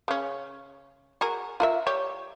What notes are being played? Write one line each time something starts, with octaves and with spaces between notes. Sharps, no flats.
C#3 C#4
F#4 G#4 A#4
F4 A#4 E5
G3 G4 C#5